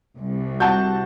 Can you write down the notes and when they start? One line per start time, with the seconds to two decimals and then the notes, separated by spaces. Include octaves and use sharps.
0.17 C2
0.60 F#4 F#5 A5 G6